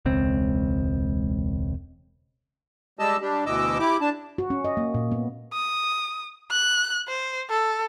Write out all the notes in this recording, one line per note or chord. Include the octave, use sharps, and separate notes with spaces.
E1 C#2 C4
G3 G#3 G4 D#5 A5 E6
G3 D4 G4
D2 B2 E3 D#5 D6 E6
E4 G4 D6
D4 A5
F#4
C#4
D#5
A#3
A#2
B3
D#6
F#6
C5
A4